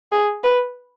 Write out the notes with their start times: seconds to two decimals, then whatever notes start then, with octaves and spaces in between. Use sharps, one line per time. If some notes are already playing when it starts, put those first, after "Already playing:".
0.12 G#4
0.44 B4